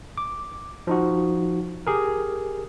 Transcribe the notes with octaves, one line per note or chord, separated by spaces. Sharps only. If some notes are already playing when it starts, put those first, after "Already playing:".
D6
F3 D#4 F#4
G4 G#4 A#4